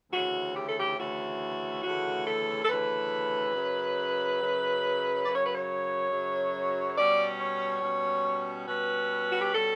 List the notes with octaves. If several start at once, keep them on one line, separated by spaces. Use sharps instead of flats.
D2 C#3 E3 A3 F#4
G4
A4
G4
D2 C#3 E3 A3 F#4
D2 C#3 E3 A3 F#4
A4
A4
D2 C#3 E3 A3 B4
F#2 C#3 F#3
F#2 C#3 F#3
F#2 C#3 F#3 D5
C#5
B4
C#5
F#2 C#3 F#3
C#5
B2 G3 C#4 D5
C#5
B2 G3 C#4
B2 G3 C#4 B4
F#4
G4
B2 G3 C#4 A4